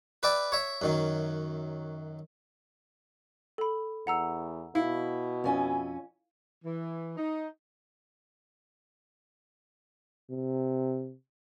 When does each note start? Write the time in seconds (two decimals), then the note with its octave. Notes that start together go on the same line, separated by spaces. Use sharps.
0.23 B4 D5 E5 G5
0.52 C#5 E5
0.82 F#2 D#3 F#3
3.58 A4 B5
4.07 E2 F#5 A#5 E6
4.75 B2 E4 F5
5.44 F2 C#4 G#5
6.65 E3
7.17 D#4
10.30 C3